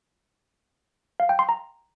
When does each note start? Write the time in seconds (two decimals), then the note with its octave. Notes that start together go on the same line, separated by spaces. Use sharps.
1.20 F5
1.29 G5
1.39 C6
1.49 A#5